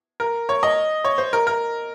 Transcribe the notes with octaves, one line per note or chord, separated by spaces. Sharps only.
A#4
C#5
D#5
C#5
C5
A#4
A#4